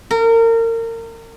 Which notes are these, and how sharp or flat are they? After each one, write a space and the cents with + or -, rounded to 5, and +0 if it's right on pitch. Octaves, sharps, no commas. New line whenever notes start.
A#4 -30